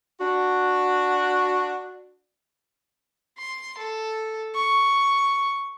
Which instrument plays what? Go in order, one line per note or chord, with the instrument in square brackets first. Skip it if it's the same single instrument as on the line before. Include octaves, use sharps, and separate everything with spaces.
[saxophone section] D4 F#4
[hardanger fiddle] C6
A4
C#6